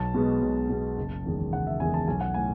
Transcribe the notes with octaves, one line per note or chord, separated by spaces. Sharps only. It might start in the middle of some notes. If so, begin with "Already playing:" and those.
Already playing: B1 A5
B2 G#3 B3
B1
B2 G#3 B3
F#1
E2 D#3 G#3
F#1 F#5
E5
E2 D#3 G#3 G#5
A5
B1 G#5
F#5
A2 G#5